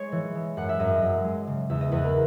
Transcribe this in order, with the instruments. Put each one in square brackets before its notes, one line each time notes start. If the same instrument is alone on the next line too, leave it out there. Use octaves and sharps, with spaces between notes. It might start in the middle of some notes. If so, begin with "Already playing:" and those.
Already playing: [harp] G#3 C#5
E3
G#3
F#2 F#5
E5
F#2 D#5
F#2
G#3
C#3
E2 E5
D#5
E2 B4
A#4